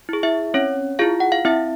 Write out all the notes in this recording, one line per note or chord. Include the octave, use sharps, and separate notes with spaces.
E4 G#4
E4 E5
C4 C#4 C#5
E4 F4 G#4 F5
F#5
F5
C4 E4 E5